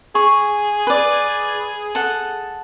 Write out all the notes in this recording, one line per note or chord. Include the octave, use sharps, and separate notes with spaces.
G#4 C#6
B4 D5
A4 F#5